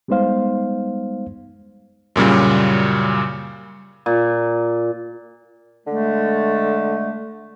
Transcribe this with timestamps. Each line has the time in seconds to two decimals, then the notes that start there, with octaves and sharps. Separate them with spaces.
0.08 G3 G#3 B3 D#4 C5 F5
2.16 F#2 A#2 C#3 G3
4.06 A#2
5.87 D3 G#3 A3